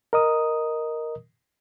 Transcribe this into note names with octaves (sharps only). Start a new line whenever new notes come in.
A#4 D#5 D#6